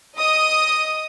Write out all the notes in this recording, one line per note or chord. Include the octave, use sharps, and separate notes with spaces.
D#5 D#6